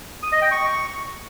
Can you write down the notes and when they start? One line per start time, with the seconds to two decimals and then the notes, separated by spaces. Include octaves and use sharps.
0.23 D#6
0.32 D#5
0.42 G5
0.51 C#6